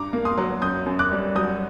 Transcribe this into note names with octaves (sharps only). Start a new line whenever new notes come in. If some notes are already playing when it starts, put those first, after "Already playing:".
Already playing: G2 A#5 D6
A#3
C6 D#6
F#3
F#2 D#6 G6
F#2
D6 F#6
G3
F#3 D#6 G6